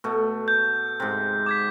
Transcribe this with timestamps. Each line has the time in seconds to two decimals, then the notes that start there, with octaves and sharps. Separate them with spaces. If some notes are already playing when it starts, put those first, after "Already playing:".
0.04 B2 A3
0.48 G6
1.00 G#2 C3
1.46 D6 G#6 B6